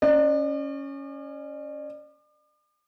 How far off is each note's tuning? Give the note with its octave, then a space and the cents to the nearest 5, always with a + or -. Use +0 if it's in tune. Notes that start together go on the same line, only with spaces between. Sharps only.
C#4 +0 D5 +40